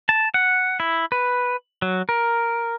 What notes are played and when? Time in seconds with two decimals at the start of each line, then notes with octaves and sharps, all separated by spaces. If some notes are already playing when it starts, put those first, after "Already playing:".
0.09 A5
0.34 F#5
0.80 E4
1.12 B4
1.82 F#3
2.09 A#4